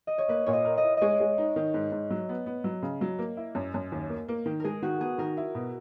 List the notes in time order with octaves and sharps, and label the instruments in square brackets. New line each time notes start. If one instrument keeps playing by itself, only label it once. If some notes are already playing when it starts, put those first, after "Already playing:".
[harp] D#5
C#5
[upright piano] A#3 [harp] B4
[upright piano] A#2 [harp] C#5
[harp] D#5
[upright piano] A#4
[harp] D#5
[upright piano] E4
[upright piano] G#3 [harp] C#5 D#5
[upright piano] G#3
D#4
D#3
G#2
G#2
F#3
B3
B3
F#3
C#3
F#3
A#3
E4
F#2
F#2
D#2
A#3
A#3
D#3
[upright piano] G#3 [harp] G#4 A#4
[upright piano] D#3 [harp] F#4
[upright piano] B3 [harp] G#4
[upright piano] D#3 [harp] A#4
[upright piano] E4
B2